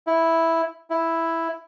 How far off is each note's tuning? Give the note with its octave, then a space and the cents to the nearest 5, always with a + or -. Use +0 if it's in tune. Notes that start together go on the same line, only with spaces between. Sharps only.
E4 -5
E4 +0